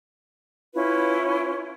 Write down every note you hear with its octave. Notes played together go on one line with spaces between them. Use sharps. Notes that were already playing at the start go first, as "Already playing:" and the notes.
C#4 E4 F4 B4